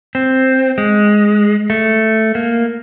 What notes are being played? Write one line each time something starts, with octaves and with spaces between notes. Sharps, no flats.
C4
G#3
A3
A#3